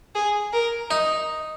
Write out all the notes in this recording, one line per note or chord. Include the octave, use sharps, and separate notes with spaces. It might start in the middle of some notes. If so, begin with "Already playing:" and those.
G#4
A#4
D#4